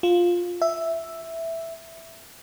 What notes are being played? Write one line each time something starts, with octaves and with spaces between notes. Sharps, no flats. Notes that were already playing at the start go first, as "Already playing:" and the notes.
F4
E5